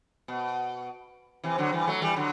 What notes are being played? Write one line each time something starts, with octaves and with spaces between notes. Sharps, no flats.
B2
C3 E3
D3 F#3
E3 G3
F#3 A3
E3 G3
D3 F#3